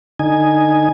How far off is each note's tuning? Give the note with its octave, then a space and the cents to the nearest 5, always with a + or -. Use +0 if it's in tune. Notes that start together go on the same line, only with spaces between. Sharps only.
D3 +15 D#4 -5 G#5 +0